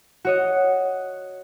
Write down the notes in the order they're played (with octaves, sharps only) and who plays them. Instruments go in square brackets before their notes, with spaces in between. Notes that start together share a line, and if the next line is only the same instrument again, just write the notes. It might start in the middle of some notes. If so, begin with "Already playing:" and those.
[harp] F#4 C#5 D#5